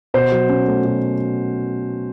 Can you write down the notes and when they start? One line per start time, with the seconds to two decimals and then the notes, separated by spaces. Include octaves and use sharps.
0.14 B2 C5
0.32 F#3
0.49 C#4
0.67 A3
0.84 B2